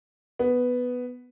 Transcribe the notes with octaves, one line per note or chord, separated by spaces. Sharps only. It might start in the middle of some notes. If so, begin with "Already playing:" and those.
B3